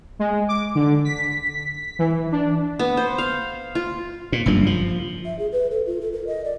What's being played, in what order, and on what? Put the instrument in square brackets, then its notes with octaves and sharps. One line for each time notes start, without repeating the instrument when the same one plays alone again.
[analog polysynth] G#3
D6
D3
B6
E3
D4
[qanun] B3
C5
F5
F4
[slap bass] A#2
F#1 G2 F3
F3
[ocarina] E5
G#4
B4
A4
F4
A4
A#4
D#5
D5